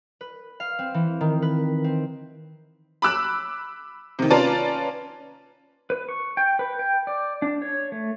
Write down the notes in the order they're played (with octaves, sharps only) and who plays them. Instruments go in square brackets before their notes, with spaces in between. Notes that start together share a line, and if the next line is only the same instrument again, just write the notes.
[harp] B4
F5
C4
E3
D#3
B4
C4
[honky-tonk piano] B5 D6 E6 F#6
C3 D#3
C#4 F4 B4 D5 A5 A#5
[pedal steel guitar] B4
C#6
G5
B4
G5
D5
D4
C#5
A3